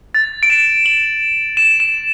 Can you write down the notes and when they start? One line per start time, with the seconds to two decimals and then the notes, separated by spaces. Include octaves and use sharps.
0.15 A6
0.43 D7
0.50 E7
0.86 F#7
1.57 E7
1.80 E7